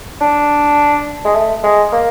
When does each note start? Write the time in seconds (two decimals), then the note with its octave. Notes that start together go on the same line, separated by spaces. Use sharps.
0.21 D4
1.25 G#3
1.35 A3
1.63 G#3
1.93 A#3